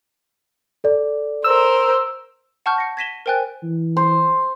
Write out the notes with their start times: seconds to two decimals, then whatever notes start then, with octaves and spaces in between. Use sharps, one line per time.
0.84 A4 D5
1.44 A#4 C5 E6
2.66 F#5 A5 C#6 F6 G6
2.78 A#6 C#7
2.97 G#6 A#6 B6 D#7 E7 G7
3.26 A#4 C5 G5 G#5 F#6 A6
3.63 E3
3.97 C5